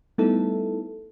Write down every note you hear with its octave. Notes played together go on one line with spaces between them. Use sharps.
G3 A3 B3 D#4 E4 A4